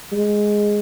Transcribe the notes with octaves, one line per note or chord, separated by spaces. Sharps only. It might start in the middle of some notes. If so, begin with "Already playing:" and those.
G#3